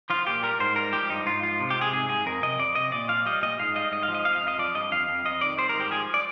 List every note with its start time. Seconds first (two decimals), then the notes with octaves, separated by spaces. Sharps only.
0.10 F3 F4
0.27 A#2 G4
0.43 G3 A#4
0.59 G#2 C5
0.76 G3 A#4
0.93 F3 G4
1.10 G2 D#4
1.26 G#2 F4
1.43 F3 F4
1.60 C3
1.70 G4
1.76 C3
1.81 G#4
1.92 G#2 G#4
2.09 G#2 G#4
2.26 F2 A#4
2.43 C3 D#5
2.59 F2 D5
2.75 C3 D#5
2.92 A#2 D5
3.09 F3 F5
3.26 G3 D#5
3.42 A#2 D#5
3.59 G#2 F5
3.75 G3 D#5
3.92 G#2 D#5
4.03 F5
4.08 F3
4.14 D#5
4.25 F2 F5
4.36 F5
4.42 F2
4.48 D#5
4.59 F3 D5
4.75 G2 D#5
4.92 F2 F5
5.09 F2
5.25 F2 D#5
5.41 D#3 D5
5.58 G3 C5
5.69 A#4
5.75 G#2
5.80 G4
5.91 F3 G#4
6.14 D5